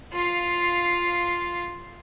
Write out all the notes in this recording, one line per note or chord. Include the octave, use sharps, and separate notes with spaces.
F4 F5